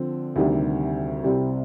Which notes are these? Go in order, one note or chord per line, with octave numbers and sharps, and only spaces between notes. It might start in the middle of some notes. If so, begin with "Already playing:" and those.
Already playing: D3 F3 C4
D2 C3 D#3 G3 D4
C2 C3 G3 C4